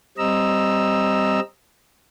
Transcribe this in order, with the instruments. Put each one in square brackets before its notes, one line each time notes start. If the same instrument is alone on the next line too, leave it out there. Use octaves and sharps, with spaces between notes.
[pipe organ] G3 C4 D#5 A#5 E6